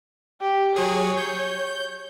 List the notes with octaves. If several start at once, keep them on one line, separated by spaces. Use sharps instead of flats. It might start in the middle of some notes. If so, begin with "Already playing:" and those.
G4
F#3 G#4 C#5
G6